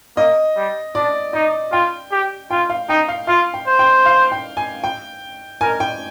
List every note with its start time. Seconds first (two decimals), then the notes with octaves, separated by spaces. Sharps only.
0.17 A#3 D#5
0.56 G3
0.95 D4 D5
1.33 D#4 D#5
1.72 F4 G5
2.11 G4
2.51 F4 G5
2.70 F5
2.89 D#4 G5
3.08 F5
3.27 F4 F5
3.54 G5
3.67 C5
3.79 G5
4.06 F5
4.32 G5
4.57 G#5
4.84 G5
5.61 A#4 G#5
5.80 G5